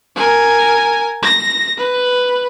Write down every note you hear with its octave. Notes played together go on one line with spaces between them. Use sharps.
A#4 G#5
A#6
B4